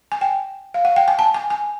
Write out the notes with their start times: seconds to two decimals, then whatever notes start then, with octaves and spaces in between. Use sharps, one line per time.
0.12 G#5
0.21 G5
0.74 F5
0.85 F#5
0.96 G5
1.08 G#5
1.19 A5
1.34 G#5
1.50 G#5